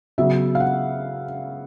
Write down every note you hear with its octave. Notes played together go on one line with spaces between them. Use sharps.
C#3 F#3 B3 E5
F5
F#5